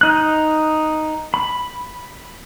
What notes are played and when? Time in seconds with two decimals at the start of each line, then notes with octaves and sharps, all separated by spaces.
0.01 D#4 F#6
1.34 B5